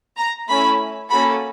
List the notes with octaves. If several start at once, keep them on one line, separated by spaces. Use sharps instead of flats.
A#5
A3 C#4 E4 B5
A#3 C#4 F#4 A4 B5